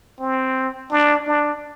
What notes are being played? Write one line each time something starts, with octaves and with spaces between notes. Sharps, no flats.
C4
D4
D4